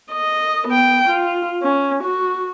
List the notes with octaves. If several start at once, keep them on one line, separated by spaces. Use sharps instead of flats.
D#5
B3 G5
F4
C#4
F#4